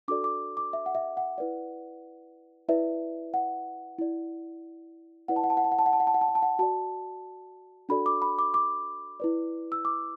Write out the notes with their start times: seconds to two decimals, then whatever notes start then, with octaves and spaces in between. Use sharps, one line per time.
0.08 D4 F#4 A4 D5 D6
0.24 D6
0.57 D6
0.73 E5
0.86 F#5
0.95 E5
1.17 F#5
1.38 E4 B4 D5
2.69 E4 B4 D5 E5
3.34 F#5
3.98 E4 D5
5.28 E4 B4 D5 F#5
5.36 A5
5.44 F#5
5.50 A5
5.57 F#5
5.64 A5
5.72 F#5
5.79 A5
5.86 F#5
5.93 A5
6.00 F#5
6.07 A5
6.14 F#5
6.21 A5
6.28 F#5
6.35 A5
6.42 F#5
6.59 F#4 D5 A5
7.89 D4 F#4 A4 D5 B5
8.06 D6
8.22 B5
8.39 D6
8.54 D6
9.20 E4 B4 D5
9.72 E6
9.85 D6